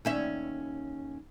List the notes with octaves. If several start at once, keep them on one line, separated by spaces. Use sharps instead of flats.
D#2 C#4 E5